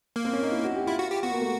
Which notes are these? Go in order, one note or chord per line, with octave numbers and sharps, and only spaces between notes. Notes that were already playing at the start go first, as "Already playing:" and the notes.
A#3
C4
C#4
D#4
E4
F#4
G4
E4 F4
F#4
G4
B3 F#4
A#3
A3